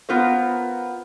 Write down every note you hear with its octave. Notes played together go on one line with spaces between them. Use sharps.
B3 F4 A#4 C5